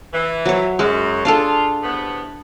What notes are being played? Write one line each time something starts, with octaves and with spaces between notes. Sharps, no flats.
E3
F#3 C#5
F#2 G#3
D4 F4 G#4 A4
A2 C3 B3